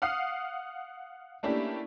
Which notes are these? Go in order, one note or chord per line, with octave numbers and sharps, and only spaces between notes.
F5 F#5 D#6 F6 C7
A3 A#3 C#4 D4 E4 G4